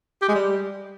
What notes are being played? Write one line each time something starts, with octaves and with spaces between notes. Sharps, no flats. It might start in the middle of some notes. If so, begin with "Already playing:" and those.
G4
G#3
G3